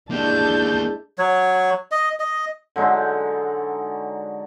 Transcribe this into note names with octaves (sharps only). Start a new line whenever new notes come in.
G#3 A#3 D4 E4 G4 A5 G6
F#3 C#5
D#5
D#5
D3 F#3 G#3 D#4